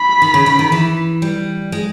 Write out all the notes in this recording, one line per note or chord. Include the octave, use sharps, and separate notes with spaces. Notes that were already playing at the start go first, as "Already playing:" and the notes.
Already playing: B5
D#3
C#3
D#3
D#3
E3
G3
G#3